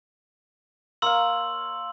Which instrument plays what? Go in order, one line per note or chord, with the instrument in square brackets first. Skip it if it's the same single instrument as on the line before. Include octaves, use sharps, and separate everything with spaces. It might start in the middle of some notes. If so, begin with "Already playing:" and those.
[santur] A#3 C#5 F5 [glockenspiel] C6 E6 F#7